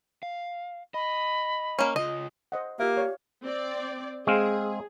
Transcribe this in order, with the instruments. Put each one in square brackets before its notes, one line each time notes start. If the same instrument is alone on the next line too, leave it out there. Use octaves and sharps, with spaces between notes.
[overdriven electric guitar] F5
[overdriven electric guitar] D#5 [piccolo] B5
[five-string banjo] A#3 C#4
[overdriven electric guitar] C#3 F4 [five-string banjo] D#5
[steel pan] C5 D#5 F#5
[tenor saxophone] A#3 [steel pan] F4 E5 [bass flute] G4
[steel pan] C#5 D5 F5
[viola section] C4 D5
[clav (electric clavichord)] G#3 C4 F5 [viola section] G#4